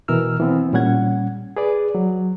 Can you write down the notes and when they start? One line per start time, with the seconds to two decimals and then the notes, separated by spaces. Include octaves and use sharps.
0.08 B2 E3 A#4 E6 F6
0.40 E3 B3 C4
0.73 A#2 G3 C#4 F#5 G#6
1.57 G#4 B4 D5
1.95 F#3